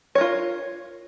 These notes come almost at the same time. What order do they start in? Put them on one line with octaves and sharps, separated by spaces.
C#5 A#4 F4